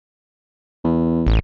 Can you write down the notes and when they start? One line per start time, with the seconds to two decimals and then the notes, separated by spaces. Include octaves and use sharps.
0.84 E2
1.27 A1